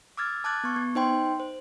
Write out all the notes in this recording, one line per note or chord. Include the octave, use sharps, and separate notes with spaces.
D6 E6 F6 G#6 A6
A5 D6 F#6 G#6 A6
B3 C#6
B3
D#4 C5 G5 C6
C5